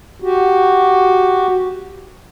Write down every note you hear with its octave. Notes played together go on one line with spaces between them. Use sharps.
F#4 G4